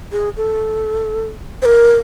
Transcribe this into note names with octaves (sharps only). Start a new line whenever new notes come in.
G#4
A4
C5
A#4